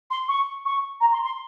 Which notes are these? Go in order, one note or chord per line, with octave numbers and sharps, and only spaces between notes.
C6
C#6
C#6
A#5
C6
C6